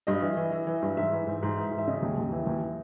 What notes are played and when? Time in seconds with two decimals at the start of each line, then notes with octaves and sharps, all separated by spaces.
0.07 G2 D#5
0.22 E3
0.37 E3
0.52 E3
0.67 E3
0.82 G2
0.97 G#2 E5
1.12 E3
1.27 G#2
1.43 G#2
1.58 E3
1.72 G#2
1.78 E5
1.87 C#3 D#5
2.02 D#2
2.17 D#2
2.32 E3
2.47 D#2